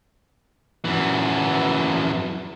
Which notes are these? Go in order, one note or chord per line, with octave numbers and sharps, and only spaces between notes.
F#2 E3